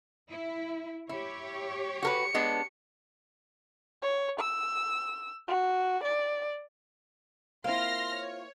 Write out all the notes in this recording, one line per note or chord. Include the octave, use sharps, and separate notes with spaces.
E4
E4 G4 C#5
F#4 A#4 B4 C#7
G#3 B3 D4
C#5
E6
F#4
D5
A#3 C4 E4 F4 C6 F6 A#6
C#5